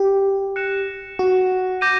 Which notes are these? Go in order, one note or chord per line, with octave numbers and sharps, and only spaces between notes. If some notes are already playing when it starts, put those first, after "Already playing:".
Already playing: G4
F#6 A#6 C#7 E7
F#4
D6 G6 A#6 D#7